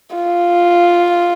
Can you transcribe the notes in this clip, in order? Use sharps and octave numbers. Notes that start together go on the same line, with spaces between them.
F4